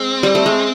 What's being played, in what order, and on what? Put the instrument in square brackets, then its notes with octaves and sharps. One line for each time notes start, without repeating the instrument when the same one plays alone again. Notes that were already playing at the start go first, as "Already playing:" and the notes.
Already playing: [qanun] G#3 [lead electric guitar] C4
[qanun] G3
A3
G#3